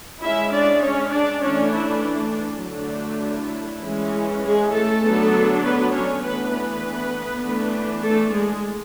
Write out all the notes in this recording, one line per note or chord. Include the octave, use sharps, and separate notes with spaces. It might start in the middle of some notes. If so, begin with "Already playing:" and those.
G#3 C#4 E4 E5
D4 D5
C#4 C#5
D4 D5
E3 A3 C#4 D4 C#5
E4
D4
D3 F#3 A3 D4
E4
E3 G#3 C#4
G#3 G#4
A3 A4
D3 F#3 B3 D4
B3 B4
C#4 C#5
E3 A3 B3 D4 B4
B3 B4
E3 A3 D4
A3 A4
G#3 G#4